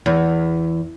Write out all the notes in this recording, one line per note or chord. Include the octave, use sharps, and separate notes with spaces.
E2